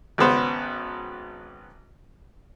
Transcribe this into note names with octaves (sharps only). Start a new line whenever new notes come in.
G#1 C#3 B3 C5